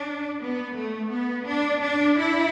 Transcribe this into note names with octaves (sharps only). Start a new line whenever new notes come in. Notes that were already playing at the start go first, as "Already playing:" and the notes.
Already playing: D4
B3
A3
B3
D4
D4
E4